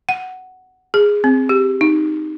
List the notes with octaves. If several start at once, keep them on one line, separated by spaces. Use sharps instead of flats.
F#5
G#4
C4
G4
D#4